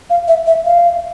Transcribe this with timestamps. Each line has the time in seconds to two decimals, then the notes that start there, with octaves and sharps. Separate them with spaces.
0.10 F5
0.28 E5
0.47 E5
0.65 F5